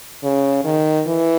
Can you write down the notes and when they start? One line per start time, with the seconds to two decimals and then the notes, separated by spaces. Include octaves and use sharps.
0.23 C#3
0.64 D#3
1.07 E3